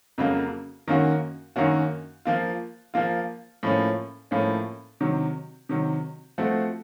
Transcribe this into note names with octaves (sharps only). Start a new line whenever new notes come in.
F2 C#3 F#3 A#3
F#2 D#3 A#3 C#4 F#4
F#2 D#3 A#3 C#4 F#4
F3 A#3 F4
F3 A#3 F4
A2 F3 A#3 C#4
A2 F3 A#3 C#4
C3 D#3 F#3
C3 D#3 F#3
F3 A3 C4 F#4